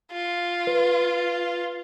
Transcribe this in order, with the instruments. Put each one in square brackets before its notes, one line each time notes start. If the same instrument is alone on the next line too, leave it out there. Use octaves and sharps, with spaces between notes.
[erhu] F4
[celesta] B4